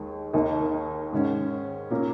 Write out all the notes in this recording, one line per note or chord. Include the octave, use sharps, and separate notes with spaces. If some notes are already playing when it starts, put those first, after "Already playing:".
Already playing: D#2 D#3 G#3
D#2 D#3 A#3 D#4
G#2 D#3 C#4
A#2 A#3 C#4